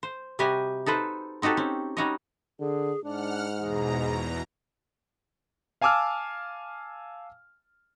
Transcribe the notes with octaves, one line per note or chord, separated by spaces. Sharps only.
C5
C3 G3 F#4 G4 D#5 G#5
D#4 A4 B4 C5
C4 D#4 F#4 G4 A4
C4 C#4
G3 C#4 D#4 F#4 C#5 D#5
D3 G#4
G#2 D4 F#5 F6
E2 B2 G#4 A#5
F5 G#5 A5 D6 E6 F6